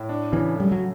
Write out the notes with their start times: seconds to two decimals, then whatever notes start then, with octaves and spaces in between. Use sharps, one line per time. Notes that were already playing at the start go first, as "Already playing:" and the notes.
Already playing: A2
0.09 D4
0.32 C#3 E3
0.56 G3 A3
0.72 F#3